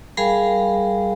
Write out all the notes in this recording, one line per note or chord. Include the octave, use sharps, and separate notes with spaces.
G3 G#4 A#4 F5 G#5 B5